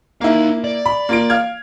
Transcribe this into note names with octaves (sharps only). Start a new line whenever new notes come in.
A#3 D#4 E4 F5
D5
B5
A#3 F4 D7
F5 F6 G#6